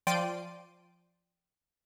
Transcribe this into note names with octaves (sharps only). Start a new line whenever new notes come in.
F3 D5 G5 C6 D7 D#7